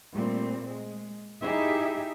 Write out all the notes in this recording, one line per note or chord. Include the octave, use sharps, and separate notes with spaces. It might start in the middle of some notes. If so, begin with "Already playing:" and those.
A#2 G3 A3 C4
G#3
D#4 E4 G4 G#4 E5